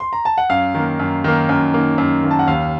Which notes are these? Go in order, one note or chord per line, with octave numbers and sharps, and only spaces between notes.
C6
A#5
A5
F#5
F#2 F5
D#3 A#3
F#2
D#3 A#3
F#2
D#3 A#3
F#2
D#3 A#3
A5
F#5
D#2 F5